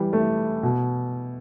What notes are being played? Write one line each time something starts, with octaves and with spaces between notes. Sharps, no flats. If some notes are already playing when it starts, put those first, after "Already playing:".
Already playing: E3 G3
A3
B2